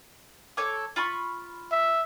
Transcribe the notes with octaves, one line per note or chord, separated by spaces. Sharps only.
A4 C#5 D6
F4 B5 C#6
E5